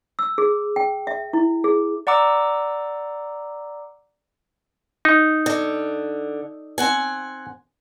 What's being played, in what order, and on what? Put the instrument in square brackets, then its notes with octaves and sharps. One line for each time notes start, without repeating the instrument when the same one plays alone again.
[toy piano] E6
G#4
G5
E5
E4
G#4
[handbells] D5 F#5 A#5 D6 E6
[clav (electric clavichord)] D#4
[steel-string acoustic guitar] D3
C4 F#5 G#5